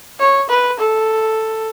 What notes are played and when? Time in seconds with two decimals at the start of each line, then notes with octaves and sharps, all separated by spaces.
0.20 C#5
0.49 B4
0.80 A4